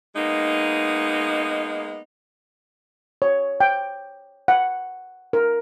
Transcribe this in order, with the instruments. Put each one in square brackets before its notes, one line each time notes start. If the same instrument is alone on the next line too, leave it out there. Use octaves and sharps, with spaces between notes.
[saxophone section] G#3 A#3 B3 D#4
[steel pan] C#5
G5
F#5
A#4